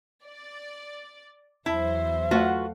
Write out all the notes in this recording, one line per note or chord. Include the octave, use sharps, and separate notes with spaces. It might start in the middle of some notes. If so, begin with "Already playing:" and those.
D5
E2 F#3 E4 C5 E5
A3 F4 F#4 B4 F5 F#5